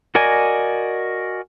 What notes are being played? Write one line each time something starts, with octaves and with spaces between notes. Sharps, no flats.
F#4 A#4 D5 D#5 G#5